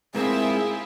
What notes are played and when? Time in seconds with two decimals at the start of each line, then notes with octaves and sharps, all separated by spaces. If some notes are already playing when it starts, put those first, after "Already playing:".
0.15 G#2 A#3 C4 E4 F4 G#4 E5